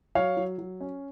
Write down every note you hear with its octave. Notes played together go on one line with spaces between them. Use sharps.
F#3 C#5 F5
F#3
F#3
C#4